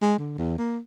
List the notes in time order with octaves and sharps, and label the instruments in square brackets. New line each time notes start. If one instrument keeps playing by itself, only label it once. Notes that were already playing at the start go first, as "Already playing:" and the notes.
[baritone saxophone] G#3
D3
E2
A#3